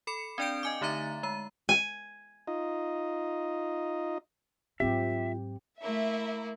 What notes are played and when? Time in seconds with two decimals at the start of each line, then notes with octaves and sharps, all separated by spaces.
0.07 A4 B5 C#7
0.38 C4 D4 D5 G5 G6 D7
0.63 D#5 G#5 D6
0.81 D3 A3 D#4 E5 A#5 A6
1.23 G#3 A#5
1.69 G#5
2.48 D#4 F4 D#5
4.80 G#2 F#3 C4 F4 G4 E5
5.81 A3 A#3 E4 E5